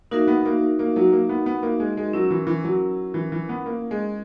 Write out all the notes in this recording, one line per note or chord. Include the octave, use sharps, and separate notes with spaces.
A#3 D#4 F#4 A#4 E5
B3
A#3
A#3
F#3
A#3
B3
B3
A#3
G#3
G#3
F#3 C#4 E4 A#4
E3
E3
F#3
E3
E3
B3
A#3
G#3